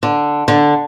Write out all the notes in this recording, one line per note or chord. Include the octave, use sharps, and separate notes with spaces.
D3
D3